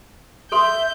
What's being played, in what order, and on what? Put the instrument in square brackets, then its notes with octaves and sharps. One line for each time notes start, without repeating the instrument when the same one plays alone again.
[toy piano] A4 C6 [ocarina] E5 [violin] G6